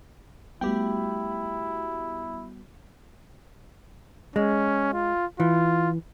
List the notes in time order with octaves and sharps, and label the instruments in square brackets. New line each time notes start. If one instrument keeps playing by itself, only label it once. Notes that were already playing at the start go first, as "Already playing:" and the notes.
[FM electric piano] G3 B3 F#4 [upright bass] A3 D#4 [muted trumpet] E4 [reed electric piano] G4 G5
[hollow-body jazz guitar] G#3 [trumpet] C#4
[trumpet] F4
[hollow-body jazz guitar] E3 [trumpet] F4